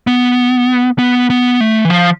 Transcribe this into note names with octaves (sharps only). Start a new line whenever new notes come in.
B3
B3
B3
A3
E3
F3